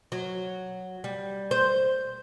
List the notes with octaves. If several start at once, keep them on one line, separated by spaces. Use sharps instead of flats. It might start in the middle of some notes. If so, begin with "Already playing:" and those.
F#3
G3
C5